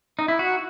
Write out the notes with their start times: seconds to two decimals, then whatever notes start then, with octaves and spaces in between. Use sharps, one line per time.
0.19 D#4
0.28 E4
0.39 F#4